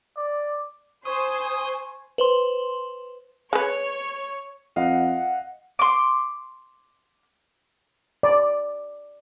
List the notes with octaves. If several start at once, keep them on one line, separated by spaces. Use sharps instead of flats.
D5
C5 G#5 C#6 D#6
B4 C5 C6
G#3 B4 C#5
F2 D#5 F5 F#5
C6 D6
D5